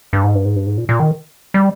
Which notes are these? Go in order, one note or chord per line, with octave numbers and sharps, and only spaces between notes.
G2
G#2
G2
G#2
G2
G#2
A#2
A#2
D#3
G3